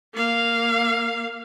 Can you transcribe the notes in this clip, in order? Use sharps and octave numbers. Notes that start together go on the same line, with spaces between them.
A#3 F5